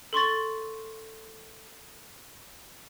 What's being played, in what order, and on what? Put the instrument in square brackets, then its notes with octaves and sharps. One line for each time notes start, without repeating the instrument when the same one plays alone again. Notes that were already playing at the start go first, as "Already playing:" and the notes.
[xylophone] A4 C6 C#6 A6